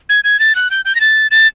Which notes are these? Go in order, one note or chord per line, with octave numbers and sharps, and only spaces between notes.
G#6
G#6
A6
F#6
G6
G6
A#6
A6
A6